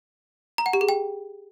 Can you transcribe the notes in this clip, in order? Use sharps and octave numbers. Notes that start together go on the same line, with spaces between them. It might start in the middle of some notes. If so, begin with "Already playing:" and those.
A#5
F#5
G4
G#4
G5